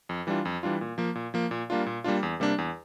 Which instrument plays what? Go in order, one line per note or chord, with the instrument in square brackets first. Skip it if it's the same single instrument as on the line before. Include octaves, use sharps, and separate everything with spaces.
[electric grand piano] F2
E3 G3 D4 F4
F2
E3 G3 D4 F4
A#2
F3 A#3
A#2
F3 A#3
A#2
G3 A#3 D4 F4
A#2
G3 A#3 D4 F4
E2
C3 G3 A#3 D4
E2